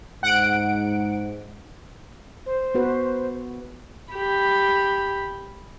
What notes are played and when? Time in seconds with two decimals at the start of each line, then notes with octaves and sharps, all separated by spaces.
0.23 G#2 F#5 D7
2.46 C5
2.74 B3 F#4 B4
4.13 G4 B5